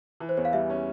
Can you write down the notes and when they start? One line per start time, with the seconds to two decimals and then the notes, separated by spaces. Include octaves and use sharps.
0.20 E3
0.29 C5
0.37 E2 C#5
0.45 F5
0.53 G3 E5
0.70 C#4